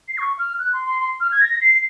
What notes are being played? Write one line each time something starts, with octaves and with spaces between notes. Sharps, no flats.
C7
C#6
F6
F#6
C6
C6
C6
F6
G#6
A#6
C7